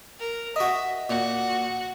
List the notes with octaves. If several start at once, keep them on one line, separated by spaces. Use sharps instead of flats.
A#4
F#4 D#5 E5
A#2 F#4